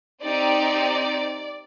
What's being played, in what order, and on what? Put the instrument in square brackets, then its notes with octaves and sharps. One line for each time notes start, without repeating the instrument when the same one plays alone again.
[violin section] C4 D#4 G4 D5